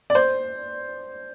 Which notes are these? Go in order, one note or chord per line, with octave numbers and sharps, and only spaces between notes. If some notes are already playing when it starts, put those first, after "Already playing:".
D5
C5